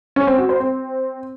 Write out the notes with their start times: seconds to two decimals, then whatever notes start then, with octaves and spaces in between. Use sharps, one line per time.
0.16 C#4
0.27 C4
0.38 F#4
0.49 C5
0.60 C4